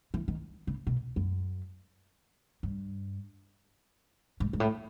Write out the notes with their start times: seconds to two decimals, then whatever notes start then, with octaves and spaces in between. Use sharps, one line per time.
0.14 E3
0.28 D#3
0.67 C#3
0.87 B2
1.16 F#2
2.63 G2
4.40 G#2
4.53 G#2
4.60 A2